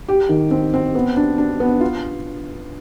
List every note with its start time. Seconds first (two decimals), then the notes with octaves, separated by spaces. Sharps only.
0.09 G4
0.29 D#3
0.51 C4
0.74 C4
0.95 B3
1.17 D4
1.38 D4
1.60 B3
1.81 F4